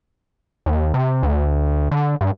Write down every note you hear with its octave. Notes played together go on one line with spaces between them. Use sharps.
D#2
C3
D2
D3
G2